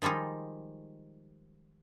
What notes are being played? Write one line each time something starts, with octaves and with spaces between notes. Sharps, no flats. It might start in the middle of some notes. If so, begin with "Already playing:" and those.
D#3 F3 G3 G#3 D#4